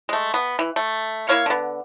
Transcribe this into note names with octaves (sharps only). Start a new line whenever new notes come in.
G#3 A3
B3
E3
A3
A#3 E4 C#5 F5
D3 B3